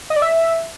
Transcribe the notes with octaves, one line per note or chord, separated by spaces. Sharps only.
D#5
D5
E5